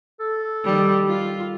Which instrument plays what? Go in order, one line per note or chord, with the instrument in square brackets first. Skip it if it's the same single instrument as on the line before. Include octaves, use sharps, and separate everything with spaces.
[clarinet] A4
[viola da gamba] D#3 G3
F4